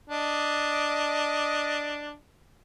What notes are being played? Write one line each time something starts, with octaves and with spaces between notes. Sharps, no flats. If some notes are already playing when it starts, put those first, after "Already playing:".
D4 D5 D#5